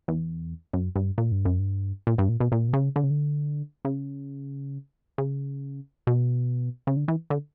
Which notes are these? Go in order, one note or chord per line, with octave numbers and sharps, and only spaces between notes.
E2
F#2
G2
A#2
G2
F#2
G2
A#2
G2
A#2
B2
A#2
B2
C#3
D3
C#3
D3
C#3
C#3
B2
C#3
D3
E3
D3